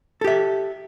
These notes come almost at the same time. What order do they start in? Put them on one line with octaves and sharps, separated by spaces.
A4 G4 E5